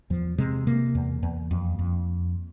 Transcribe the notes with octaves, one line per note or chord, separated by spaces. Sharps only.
E2 F3
C3 G#3
C3 A#3
E2
E2
F2
F2